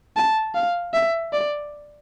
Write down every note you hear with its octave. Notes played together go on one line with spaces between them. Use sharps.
A5
F5
E5
D5